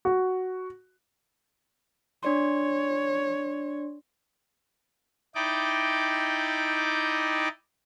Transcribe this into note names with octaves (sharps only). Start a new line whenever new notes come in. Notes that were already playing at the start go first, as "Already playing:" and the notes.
F#4
D4 C#5 D5 C6
D#4 E4 D5 D#5 G5 D6